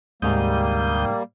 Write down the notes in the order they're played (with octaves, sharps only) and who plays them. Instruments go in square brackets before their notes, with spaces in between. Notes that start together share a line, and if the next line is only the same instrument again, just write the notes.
[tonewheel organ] D2 D#6 G6 [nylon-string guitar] G#2 C3 G#4 [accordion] G3 A#3